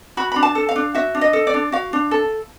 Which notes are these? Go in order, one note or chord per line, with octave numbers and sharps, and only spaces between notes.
F#4 B5
D4 B5
A5
A4
F5
D4
F#4 E5
D4
D#5
A4
D5
D4
F#4 F5
D4
A4